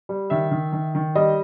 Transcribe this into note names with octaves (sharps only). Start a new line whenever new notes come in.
G3
D#3 E5
D#3
D#3
D#3
G3 D#5